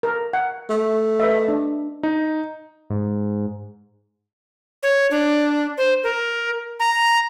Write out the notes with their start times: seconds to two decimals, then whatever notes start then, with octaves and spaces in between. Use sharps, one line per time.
0.03 A#4
0.33 F#5
0.70 A3
1.20 B4 D#5 E5
1.48 D4
2.03 D#4
2.90 G#2
4.83 C#5
5.11 D4
5.78 C5
6.03 A#4
6.80 A#5